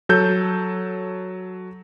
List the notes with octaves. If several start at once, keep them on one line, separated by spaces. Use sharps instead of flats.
F#3 A4 G6